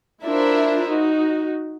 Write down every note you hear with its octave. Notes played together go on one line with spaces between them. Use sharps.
D4 E4 F4 A#4 C5 E5
D#4 F#4